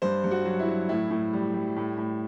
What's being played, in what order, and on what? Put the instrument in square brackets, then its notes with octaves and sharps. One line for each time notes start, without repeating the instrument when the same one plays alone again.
[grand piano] G2 C5
G2
F#4
F#3
E4
F#3
A2 E4
A2
G3
G3
A2
A2